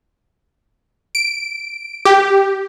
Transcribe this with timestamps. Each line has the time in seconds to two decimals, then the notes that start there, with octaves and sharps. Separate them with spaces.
1.15 D7
2.05 G4